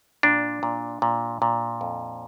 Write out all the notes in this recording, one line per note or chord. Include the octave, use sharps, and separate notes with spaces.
A#2 D4
A#2
A#2
A#2
F2